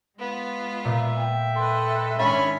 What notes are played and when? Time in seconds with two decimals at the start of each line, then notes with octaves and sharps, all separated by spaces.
0.18 G#3 B3 F4
0.85 A#2 E5
1.17 G5
1.56 A4 B4 D#5 C6
2.19 G#2 D#3 C#4 D4 E5 B5 A6